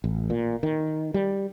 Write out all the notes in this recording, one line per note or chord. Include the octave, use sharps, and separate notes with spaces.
A1
A#2
D#3
G3